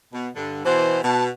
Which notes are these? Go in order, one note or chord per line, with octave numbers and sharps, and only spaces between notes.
B2
G2 D3
B2 E3 C5
B2 A5